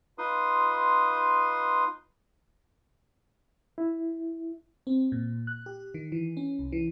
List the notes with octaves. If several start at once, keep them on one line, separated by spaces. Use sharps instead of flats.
D#4 F4 B4 C6 D#6
E4
C4
A#2
F#6
G4
D#3
E3
C#4
C2
E3